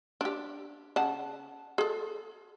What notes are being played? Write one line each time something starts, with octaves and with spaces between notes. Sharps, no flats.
D4 G4
C#3 F#5 A5
G#4 A4